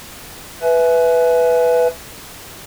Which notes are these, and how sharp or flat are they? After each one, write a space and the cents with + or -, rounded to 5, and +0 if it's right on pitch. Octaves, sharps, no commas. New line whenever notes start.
B4 +0 E5 +0 G#5 +30